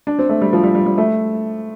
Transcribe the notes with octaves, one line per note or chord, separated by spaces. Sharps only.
D4
C4
A3
G3
F3
G3
G3
G3
A3